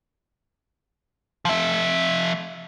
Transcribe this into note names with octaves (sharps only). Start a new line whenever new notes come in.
F3 E5